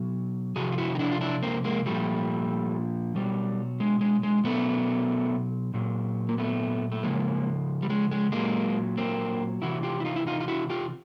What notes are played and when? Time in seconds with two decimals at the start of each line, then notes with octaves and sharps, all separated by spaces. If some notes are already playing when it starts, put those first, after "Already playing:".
Already playing: B2 F#3
0.56 C3 F3 F#4 G#4
0.72 F4
0.78 E4 F#4
0.95 D#4
0.99 D4 E4
1.12 F4
1.21 D4 E4
1.43 A#3 C4
1.64 G#3 A#3
1.86 A#2 F3 G3 A3
3.15 B2 F#3 G3
3.80 G#3
4.01 G#3
4.23 G#3
4.44 B2 F#3 A3 B3
5.74 A#2 F#3
6.29 A#3
6.38 A3 B3
6.92 A3
7.03 C#3 F3 G#3 A#3
7.82 G3
7.90 G#3
8.11 G#3
8.32 A#2 F#3 G#3 A#3
8.97 A#3 C4
9.62 C3 E3 E4 F#4
9.83 F4 G4
10.00 E4
10.05 D#4 F4
10.16 E4
10.27 D#4 F4
10.40 F4
10.48 E4 F#4
10.70 F4 G4